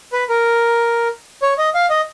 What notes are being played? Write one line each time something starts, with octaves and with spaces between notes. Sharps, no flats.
B4
A#4
C#5
D#5
F5
D#5